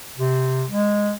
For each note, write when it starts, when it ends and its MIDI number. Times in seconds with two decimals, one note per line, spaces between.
0.18 0.65 48
0.70 1.13 56